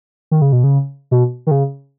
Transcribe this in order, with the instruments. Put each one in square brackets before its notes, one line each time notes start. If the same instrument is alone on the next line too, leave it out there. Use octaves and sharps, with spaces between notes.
[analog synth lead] D#3
C#3
B2
C#3
B2
D#3
C#3